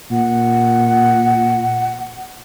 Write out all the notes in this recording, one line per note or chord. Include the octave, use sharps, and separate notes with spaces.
A#2 F#5